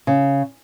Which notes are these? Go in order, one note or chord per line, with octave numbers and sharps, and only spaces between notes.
C#3